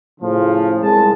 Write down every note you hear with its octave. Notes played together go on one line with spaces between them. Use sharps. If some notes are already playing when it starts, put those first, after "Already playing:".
A2 C#3 F3
C2 G#3 A5